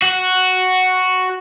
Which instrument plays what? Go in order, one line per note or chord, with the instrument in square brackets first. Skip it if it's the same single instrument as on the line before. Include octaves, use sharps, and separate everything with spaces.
[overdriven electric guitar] F#4